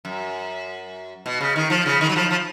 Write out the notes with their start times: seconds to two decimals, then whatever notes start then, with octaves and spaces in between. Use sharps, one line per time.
0.05 F#2
1.26 B2
1.41 C#3
1.56 D#3
1.70 F3
1.86 C#3
2.01 D#3
2.09 F#3
2.16 F3
2.31 F3